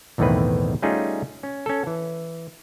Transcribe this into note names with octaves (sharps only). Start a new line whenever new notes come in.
B1 E2 A2 D#3 C4 B4
G3 A3 C#4 D#4 F4 G#4
C#4
C#4 A4
E3